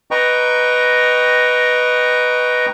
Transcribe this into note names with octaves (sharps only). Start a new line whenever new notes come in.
B4 D#5 G5 A#5 C#6